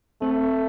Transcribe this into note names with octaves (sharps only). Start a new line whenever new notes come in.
A3 C4